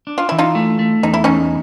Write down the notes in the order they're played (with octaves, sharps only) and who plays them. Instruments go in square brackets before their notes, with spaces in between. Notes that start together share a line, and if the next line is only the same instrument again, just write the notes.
[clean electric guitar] D4
[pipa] F4
[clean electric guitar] E3 [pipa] E4
[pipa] D#4 F4
[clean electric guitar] A3
A3
[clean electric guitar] E2 [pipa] D#4
[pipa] E4
[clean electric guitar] E2 [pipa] C#4 D#4